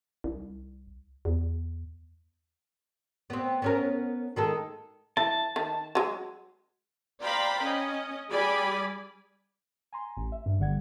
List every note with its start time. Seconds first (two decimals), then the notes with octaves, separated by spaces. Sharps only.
0.24 C2
1.25 E2
3.30 B3 C4
3.62 B3 C#4 A#4
4.36 D#3 G#3 A4
5.17 E3 A5
5.56 D#3
5.95 F#3 G#3
7.22 C5 D5 F5 G5 A#5 B5
7.63 C#4 D#5
8.31 G3 G#4 D5 G#5 B5
9.93 G#5 A#5 C6
10.17 A1
10.32 E5
10.46 G2
10.59 G1 D3 G3 F#5 G#6